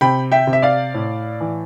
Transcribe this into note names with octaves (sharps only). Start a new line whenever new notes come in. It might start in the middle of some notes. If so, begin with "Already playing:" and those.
C3 G5 B5
E5 G5
C3
E5
D5 F5
A2
E3